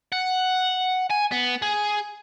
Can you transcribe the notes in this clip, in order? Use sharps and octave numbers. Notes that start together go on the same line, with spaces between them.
F#5
G#5
B3
G#4